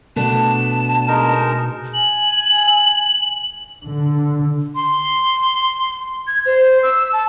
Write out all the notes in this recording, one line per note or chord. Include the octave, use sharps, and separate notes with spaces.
B2 A3 B3 D4 A5
G#3 D#4 A#4
G#5 F#7
D3
C6
G#6
C5
E6
A5